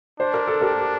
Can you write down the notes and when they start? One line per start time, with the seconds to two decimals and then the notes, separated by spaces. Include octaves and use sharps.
0.20 D4 C5
0.34 A#4
0.48 A4
0.61 G4 A#4